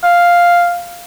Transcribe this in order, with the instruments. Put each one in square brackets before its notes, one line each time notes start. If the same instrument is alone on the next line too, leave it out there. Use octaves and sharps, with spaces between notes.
[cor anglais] F5